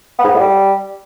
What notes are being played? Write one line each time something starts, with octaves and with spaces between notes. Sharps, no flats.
B3
G#2
B3
A2
G3